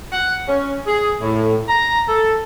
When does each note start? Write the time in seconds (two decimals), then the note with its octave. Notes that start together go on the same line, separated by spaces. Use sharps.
0.12 F#5
0.48 C#4
0.86 G#4
1.21 A2
1.69 A#5
2.09 A4